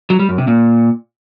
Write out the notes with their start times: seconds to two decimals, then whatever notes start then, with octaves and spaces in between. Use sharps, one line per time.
0.10 F#3
0.19 G3
0.29 F#2
0.38 C3
0.48 A#2